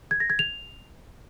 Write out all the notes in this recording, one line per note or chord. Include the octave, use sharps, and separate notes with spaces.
G#6
A#6
G#6
F7